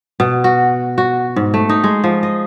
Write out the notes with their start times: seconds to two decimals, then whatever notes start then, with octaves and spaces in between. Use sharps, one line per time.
0.20 B2
0.44 F#4
0.98 F#4
1.36 G#2
1.54 A3
1.69 D#4
1.84 G#3
2.04 F3
2.23 D#5